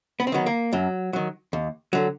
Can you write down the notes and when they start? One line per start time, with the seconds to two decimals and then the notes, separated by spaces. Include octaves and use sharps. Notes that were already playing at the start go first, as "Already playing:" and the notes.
0.20 B3
0.27 C4
0.32 D#3 F#3 B3
0.46 A#3
0.73 F#2 F#3
1.13 D#3 F#3
1.53 D#2
1.93 D3 F#3